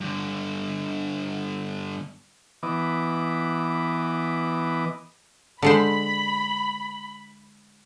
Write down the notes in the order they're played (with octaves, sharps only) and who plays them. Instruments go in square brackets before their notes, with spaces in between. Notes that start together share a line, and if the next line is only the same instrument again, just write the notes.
[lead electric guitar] G2 D3
[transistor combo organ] E3 B3 D#5 D6
[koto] D3 G#3 C5 [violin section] B5